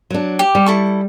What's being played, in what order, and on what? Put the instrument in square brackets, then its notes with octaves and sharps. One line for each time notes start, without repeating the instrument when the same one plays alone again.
[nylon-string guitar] F#3 D4
[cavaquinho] G4
[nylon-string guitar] G3
[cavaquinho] E4 A4 C#6